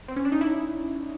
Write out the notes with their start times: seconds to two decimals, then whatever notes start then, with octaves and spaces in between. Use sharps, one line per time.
0.08 C4
0.16 C#4
0.25 D4
0.32 D#4
0.41 E4